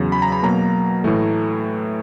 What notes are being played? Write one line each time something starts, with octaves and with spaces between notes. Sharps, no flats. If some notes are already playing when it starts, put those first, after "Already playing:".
Already playing: E2 C#3 F#3
B5
A#5
B5
B2 F#3 A#3 A#5
A2 E3 A3